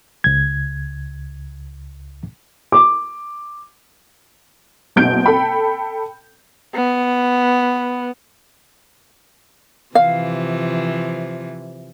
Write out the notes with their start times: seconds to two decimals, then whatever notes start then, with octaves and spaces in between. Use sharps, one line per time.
0.24 C#2 G#6
2.72 D6
4.96 F#1 B2 G6 D7
5.26 A4 G5 B5
6.75 B3
9.95 C3 E3 F3 F5